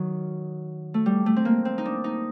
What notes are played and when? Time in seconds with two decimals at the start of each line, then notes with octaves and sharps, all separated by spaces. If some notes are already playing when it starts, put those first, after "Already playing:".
Already playing: D#3 F#3
0.94 A3
1.06 G3
1.26 A3
1.36 C4
1.45 A#3
1.65 C4
1.78 D#4
1.85 D4
2.04 D#4